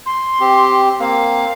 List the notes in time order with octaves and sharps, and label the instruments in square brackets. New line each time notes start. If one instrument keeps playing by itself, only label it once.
[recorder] C6
[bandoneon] C4 G4
[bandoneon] A#3 C4 [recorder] F5